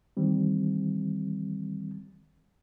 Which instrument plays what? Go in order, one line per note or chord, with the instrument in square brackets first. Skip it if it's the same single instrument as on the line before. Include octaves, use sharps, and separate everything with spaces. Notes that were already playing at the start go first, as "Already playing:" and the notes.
[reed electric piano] D#3 E3 G3 C4